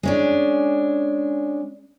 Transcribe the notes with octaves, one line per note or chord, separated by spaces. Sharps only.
G#3 C#4 D4